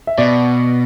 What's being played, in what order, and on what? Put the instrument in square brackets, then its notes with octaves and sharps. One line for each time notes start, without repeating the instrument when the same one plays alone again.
[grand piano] E5
[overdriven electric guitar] B2 [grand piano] D5